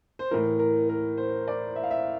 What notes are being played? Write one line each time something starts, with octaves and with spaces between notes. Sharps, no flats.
C5
A2 E3 A#4
A#4
A#4
C5
D5
E5
F5
E5